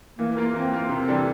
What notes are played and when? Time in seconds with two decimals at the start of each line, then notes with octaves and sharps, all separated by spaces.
0.19 E3 A#3
0.37 A#3 F4 A#4
0.54 E3 C4
0.72 A#3 F4 A#4
0.89 C3
1.08 E3 G3 D4 A4